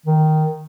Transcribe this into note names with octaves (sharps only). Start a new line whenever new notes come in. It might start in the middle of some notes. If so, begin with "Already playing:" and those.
D#3